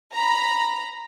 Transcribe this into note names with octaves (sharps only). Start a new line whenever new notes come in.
A#5 B5